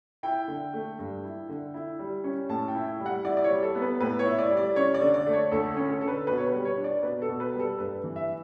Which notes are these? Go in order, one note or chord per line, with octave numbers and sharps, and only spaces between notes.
E4 G5
D3
A3
G2
E4
D3
E4
G3
C#4
A2 A5
G5
E4
G3
F#5
E4 D5
D5
C#5
G3
A4
B3
B4
A2 B4
C#5
E4
D5
G3
D5
C#4 C#5
D5
D3
D5
A3
C#5
D2 A4
C#4
A4
D3 A4
B4
B2 B4
C#5
B4
G3
C#5
D4
D5
B2 B4
A4
B2
B4
G3
A4
G2 B4
E3
E5